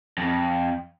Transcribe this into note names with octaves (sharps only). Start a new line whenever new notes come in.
F2